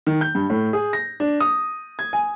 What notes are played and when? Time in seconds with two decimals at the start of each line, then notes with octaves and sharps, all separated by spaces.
0.07 D#3
0.21 G6
0.35 G2
0.50 A2
0.73 G#4
0.93 A#6
1.20 D4
1.40 D#6
1.99 G#6
2.13 G#5